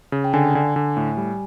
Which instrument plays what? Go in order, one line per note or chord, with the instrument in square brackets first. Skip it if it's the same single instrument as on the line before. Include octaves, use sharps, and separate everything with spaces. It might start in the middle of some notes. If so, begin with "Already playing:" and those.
[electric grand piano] C#3
[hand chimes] G5
[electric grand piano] D3 [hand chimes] G#5
[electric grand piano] D3
D3
A2
G3